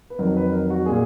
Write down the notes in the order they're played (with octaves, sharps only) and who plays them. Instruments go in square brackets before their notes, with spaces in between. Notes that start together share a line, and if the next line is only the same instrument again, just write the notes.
[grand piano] B4
F2 D#3 F#3 A#4
B4
A#4
F#4
A#2 G#4